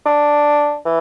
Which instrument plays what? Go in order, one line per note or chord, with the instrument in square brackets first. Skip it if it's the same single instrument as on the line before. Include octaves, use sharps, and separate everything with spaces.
[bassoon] D4
E3